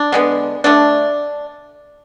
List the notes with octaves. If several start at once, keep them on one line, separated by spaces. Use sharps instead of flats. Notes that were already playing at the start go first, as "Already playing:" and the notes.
Already playing: D4
D3 G#3 B3
D3 A3 D4